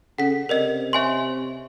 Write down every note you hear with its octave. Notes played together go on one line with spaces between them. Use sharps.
C#3 C#4 A4 F#5 B6
C3 A#4 D5 D#5
C#5 D#5 E5 G#5 C6 C#6